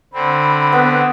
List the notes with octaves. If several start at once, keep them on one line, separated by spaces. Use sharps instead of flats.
D3 C4 B5
B3 B4